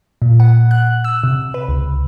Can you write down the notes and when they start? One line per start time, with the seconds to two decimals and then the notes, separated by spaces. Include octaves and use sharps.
0.22 A#2
0.40 F#5
0.71 F#6
1.04 E6
1.23 C3
1.54 B4
1.68 C#2